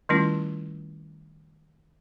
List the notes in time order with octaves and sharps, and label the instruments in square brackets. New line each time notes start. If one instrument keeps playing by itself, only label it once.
[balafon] D#3 G3 A3 C#4 E4 F4